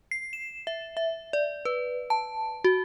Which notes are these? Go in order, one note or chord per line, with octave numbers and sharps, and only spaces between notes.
C7
E7
E5
E5
D5
B4
A5
F#4